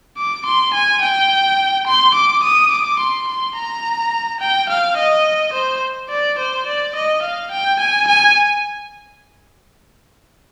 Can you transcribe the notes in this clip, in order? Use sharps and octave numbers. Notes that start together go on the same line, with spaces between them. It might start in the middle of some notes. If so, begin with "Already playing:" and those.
D6
C6
G#5
G5
C6
D6
D#6
D6
C6
C6
A#5
G5
F5
D#5
C5
D5
C5
D5
D#5
F5
G5
G#5
G#5